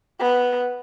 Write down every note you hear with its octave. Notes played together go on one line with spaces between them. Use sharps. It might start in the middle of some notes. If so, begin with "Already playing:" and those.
B3